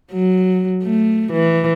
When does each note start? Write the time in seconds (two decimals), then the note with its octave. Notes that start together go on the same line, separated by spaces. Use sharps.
0.13 F#3
0.84 A3
1.33 E3